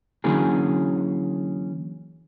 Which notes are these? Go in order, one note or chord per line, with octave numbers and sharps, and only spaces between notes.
D3 E3 F#3 A#3 C#4 G#4